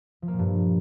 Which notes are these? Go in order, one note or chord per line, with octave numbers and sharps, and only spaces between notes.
F3
A#3
A#2
G2